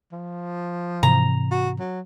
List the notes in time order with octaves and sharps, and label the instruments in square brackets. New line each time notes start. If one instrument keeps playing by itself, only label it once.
[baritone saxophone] F3
[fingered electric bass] G#2 C3 E3 [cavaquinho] A#5
[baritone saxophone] F#4
F#3